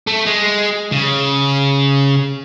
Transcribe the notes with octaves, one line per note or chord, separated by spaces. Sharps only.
A3
G#3
C#3